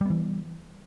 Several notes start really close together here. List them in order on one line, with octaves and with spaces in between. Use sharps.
G3 B3 E3